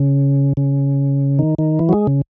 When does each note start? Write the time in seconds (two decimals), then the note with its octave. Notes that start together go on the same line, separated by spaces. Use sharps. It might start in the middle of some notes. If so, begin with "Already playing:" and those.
Already playing: C#3
0.57 C#3
1.39 D#3
1.59 D#3
1.79 E3
1.89 F#3
1.93 G#3
2.07 C#3